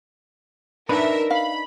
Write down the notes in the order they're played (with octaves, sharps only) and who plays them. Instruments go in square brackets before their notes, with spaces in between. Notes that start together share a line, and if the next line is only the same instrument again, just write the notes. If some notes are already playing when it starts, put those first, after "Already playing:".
[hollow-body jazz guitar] D4 D#4 B4 [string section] A#4 E5
[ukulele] F5 [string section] B5